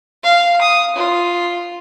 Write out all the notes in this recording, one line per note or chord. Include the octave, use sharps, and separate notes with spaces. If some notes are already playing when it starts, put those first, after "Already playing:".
F5
D#6
F4